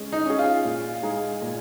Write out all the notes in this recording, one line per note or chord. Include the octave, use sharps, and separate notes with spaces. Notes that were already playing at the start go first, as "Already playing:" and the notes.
Already playing: G#3 C#4
D#4
C#4 G#4
F4
A#2
G#3 D#4 G#4
A#2